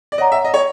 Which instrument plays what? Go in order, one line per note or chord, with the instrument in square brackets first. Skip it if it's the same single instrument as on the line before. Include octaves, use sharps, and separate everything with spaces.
[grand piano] D5
[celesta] C#5 F#5 A#5 [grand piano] D#5
[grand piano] E5
D#5
C#5